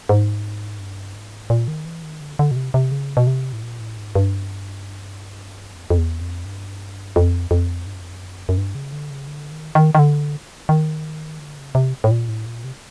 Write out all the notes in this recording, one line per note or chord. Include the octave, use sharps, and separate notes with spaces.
G#2
G2
G#2
A#2
D#3
E3
D#3
D3
D3
B2
C3
C3
C#3
B2
C3
A2
A#2
A2
G#2
G2
F2
F2
E2
F2
G2
F2
F2
G2
F#2
F2
F#2
F#2
G2
C#3
D3
C#3
D3
D#3
D#3
D#3
D3
D#3
D3
C#3
C3
A2
A#2
A2
A#2
C3